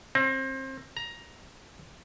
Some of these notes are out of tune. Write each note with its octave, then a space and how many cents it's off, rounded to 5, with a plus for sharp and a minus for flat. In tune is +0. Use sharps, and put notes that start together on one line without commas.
C4 +30
A#5 +15